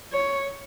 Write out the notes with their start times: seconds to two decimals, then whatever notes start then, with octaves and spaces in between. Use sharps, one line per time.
0.12 C#5